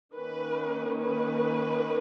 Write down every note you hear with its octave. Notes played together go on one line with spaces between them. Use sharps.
D#3 A#3 C#4 B4
B4